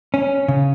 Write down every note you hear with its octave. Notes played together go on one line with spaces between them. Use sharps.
C#4
C#3